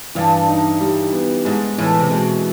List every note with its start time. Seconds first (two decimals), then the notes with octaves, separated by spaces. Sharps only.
0.15 G2 E3
0.48 D#4
0.81 G3
1.13 B3
1.45 G#2 G#3
1.78 A2 E3
2.00 C3
2.11 B2 G#3